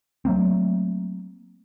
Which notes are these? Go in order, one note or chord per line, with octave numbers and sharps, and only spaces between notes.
F#3 A3 A#3 C4